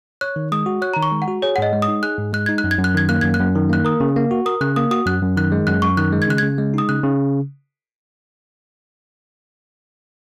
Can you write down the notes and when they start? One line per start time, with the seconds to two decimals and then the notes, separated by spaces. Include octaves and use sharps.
0.21 C#5 F#6
0.36 D#3
0.52 G#3 D#6
0.66 F#4
0.82 C#5 F#6
0.94 D#3 A#5
1.03 C#6
1.12 G#3
1.22 F#5
1.28 F#4
1.42 G#4 C#5
1.56 F#5
1.58 G#2 D#5
1.73 G#3
1.82 D#6
1.88 D#4
2.03 G#4 F#6
2.18 G#2
2.33 G#3 F#6
2.46 D#4 G#6
2.58 F#6
2.64 F#2
2.71 G#6
2.78 F#2
2.84 F#6
2.94 D#3 G#6
3.09 A#3 F#6
3.21 F#2 G#6
3.34 F#6
3.40 F#2
3.55 D#3
3.69 A#3 F#6
3.85 A#4 D#6
4.00 C#3
4.16 A#3
4.31 F#4
4.46 A#4 D#6
4.61 C#3 F#6
4.76 A#3 D#6
4.91 F#4 D#6
5.06 F#2 F#6
5.22 F#2
5.36 D#3 F#6
5.52 G#3
5.67 F#2 F#6
5.82 F#2 C#6
5.97 D#3 F#6
6.12 G#3
6.22 G#6
6.27 C#3 F#6
6.38 C#3 G#6
6.58 G#3
6.74 D#4 D#6
6.89 C#3 F#6
7.03 C#3